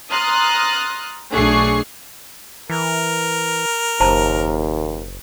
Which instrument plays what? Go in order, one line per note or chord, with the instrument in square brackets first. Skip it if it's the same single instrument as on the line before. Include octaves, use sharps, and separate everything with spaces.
[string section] A#5 C6 D#6 F6 F#6 A6
B1 A3 D4 G#4 C#6 C7
[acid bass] E3 [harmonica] A#4
[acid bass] F#1 [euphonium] D#2 [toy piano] C5 A5 A#5